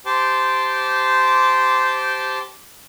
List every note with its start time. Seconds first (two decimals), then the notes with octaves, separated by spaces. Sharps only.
0.05 G4 C5 G5 A5 C6 D6